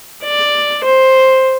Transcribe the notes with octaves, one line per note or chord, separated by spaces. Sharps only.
D5
C5